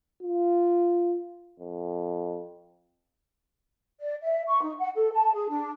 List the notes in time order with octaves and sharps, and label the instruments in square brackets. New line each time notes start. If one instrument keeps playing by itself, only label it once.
[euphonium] F4
F2
[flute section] D5
E5
C#6
D#4
F#5
A4
A5
G#4
D4